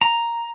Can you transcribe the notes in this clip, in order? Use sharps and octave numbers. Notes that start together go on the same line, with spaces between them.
A#5